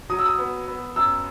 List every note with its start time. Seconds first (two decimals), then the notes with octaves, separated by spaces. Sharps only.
0.09 F#3 D#6
0.19 E6
0.26 D#6
0.38 B3
0.68 B3
0.96 F#2 E6